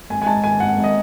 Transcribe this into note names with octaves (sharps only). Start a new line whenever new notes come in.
G#1 G#5
G#5
G#2 A5
D#3 G#5
G#1 F#5
G#1
D#5